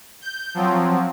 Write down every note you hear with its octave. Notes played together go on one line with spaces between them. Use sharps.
G6
F3 F#3 C4